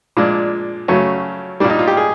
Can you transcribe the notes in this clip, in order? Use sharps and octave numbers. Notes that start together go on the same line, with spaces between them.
A#2 F3 G#3 D4
F#2 C#3 F#3 A3 C#4
A#2 G3 D4
D#4
F4
G4
G#4